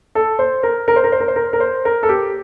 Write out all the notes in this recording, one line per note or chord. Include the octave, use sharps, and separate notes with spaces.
A4
C5
A#4
A#4
C5
A#4
C5
A#4
C5
A#4
A#4
C5
A#4
A4
G4